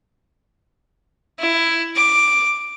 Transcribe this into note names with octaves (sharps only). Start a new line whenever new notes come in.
E4
D6